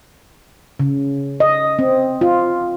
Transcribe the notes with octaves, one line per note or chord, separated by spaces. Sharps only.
C#3
D#5
C4
F4